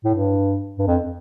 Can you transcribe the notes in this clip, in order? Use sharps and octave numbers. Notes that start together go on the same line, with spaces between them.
A2
G2
G2
F2